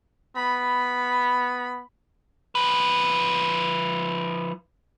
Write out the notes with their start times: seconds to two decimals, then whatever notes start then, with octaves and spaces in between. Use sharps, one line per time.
0.36 B3 B5
2.55 F3 B4